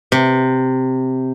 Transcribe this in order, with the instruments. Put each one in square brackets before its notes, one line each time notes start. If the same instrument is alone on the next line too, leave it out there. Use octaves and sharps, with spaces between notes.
[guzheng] C3